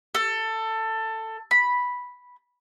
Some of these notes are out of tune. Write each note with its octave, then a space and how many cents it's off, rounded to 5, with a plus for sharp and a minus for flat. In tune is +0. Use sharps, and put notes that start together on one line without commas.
A4 +15
B5 -5